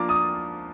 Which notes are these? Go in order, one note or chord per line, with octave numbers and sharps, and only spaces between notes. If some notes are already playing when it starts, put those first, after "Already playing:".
Already playing: F3 A#3 D4 F4 D6
D#6